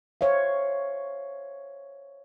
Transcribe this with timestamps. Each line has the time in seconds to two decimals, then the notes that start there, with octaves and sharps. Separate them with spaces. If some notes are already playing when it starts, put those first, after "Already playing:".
0.21 C5 C#5 E5 F5